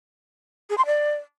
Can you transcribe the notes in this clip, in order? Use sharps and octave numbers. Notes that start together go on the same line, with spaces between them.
G#4
C6
D5